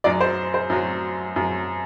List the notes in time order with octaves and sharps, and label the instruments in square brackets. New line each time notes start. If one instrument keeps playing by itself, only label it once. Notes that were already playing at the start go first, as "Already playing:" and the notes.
[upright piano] F#2 F#3 D5
C5
C5
F#2 F#3
F#2 F#3